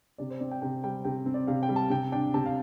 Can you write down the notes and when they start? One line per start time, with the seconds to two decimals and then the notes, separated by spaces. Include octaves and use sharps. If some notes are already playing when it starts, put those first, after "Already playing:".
0.18 C3 D5
0.30 C5
0.40 C4 D5
0.51 G5
0.62 C3 G5
0.84 G3 G5
1.05 C3 G5
1.26 C4
1.34 D5
1.47 C3 F5
1.63 G5
1.69 G3
1.76 A5
1.90 C3 G5
2.12 D4 G5
2.34 C3 A5
2.46 F5